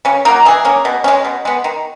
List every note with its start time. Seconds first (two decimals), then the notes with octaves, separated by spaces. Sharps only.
0.05 C#3 C#4
0.25 F#3 A#3 D#4
0.45 E3 G#4
0.65 A#3 C#4
0.85 B2
1.04 G#3 C#4
1.25 B2
1.45 G#3 B3
1.64 D#3